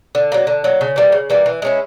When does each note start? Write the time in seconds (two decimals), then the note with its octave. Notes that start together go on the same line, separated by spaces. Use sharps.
0.15 D3
0.32 F#3 A#3
0.47 D3
0.64 F#3 A#3
0.81 C#3
0.96 E3 G3 A#3
1.12 C#3
1.30 E3 G3 A#3
1.46 E3
1.62 G#3 C#4 E4